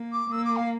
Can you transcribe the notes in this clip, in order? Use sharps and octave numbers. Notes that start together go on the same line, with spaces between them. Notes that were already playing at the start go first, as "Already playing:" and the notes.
Already playing: A#3
D6
A#3 E6
D6
F5